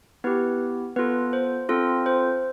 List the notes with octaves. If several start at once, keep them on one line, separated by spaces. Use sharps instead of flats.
B3 E4 G4 B4
B3 F4 A4 B4
C5
C4 F4 A4
C5